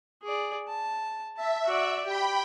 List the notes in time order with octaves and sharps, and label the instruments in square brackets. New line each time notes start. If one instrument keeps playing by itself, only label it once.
[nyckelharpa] G#4 D5
A5
[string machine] E5 [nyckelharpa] A5
[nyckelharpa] F#4 D5
[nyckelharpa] G4 [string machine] G5 B5